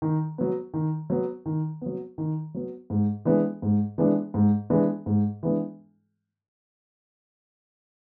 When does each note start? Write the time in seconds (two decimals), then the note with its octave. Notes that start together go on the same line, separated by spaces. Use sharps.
0.02 D#3
0.38 F#3 B3
0.74 D#3
1.10 F#3 B3
1.46 D#3
1.81 F#3 B3
2.18 D#3
2.54 F#3 B3
2.90 G#2
3.25 E3 G#3 B3 D4
3.62 G#2
3.98 E3 G#3 B3 D4
4.34 G#2
4.70 E3 G#3 B3 D4
5.06 G#2
5.43 E3 G#3 B3 D4